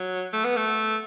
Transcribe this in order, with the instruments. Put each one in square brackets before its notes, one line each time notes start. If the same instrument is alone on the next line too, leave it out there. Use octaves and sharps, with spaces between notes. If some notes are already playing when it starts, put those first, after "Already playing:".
Already playing: [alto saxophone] F#3
A3
B3
A3